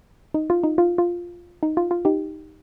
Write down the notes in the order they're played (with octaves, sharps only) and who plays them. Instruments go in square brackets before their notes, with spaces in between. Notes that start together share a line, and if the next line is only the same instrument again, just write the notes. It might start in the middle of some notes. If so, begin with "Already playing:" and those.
[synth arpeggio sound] D#4
F4
D#4
F4
F4
D#4
F4
F4
D#4 G4